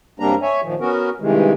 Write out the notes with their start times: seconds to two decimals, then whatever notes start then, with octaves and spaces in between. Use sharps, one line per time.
0.20 F#2 C3 G3 A#3 D4 A#5
0.42 C#5 E5 G#5
0.63 A#2 D#3 F3
0.80 B3 C#4 F#4 A#4
1.20 G2 C3 D#3 E3 G#3